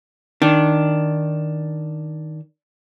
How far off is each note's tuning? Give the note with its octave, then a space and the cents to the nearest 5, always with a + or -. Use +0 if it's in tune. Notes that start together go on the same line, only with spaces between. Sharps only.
D#3 +0 D4 +0